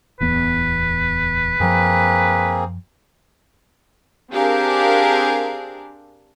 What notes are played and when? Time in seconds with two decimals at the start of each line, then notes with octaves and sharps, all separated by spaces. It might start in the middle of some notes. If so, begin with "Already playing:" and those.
0.20 D1 E2 B3 B4
1.60 F#2 F3 A#3 C4 G#4
4.32 C4 D4 G4 G#4 A#4 F5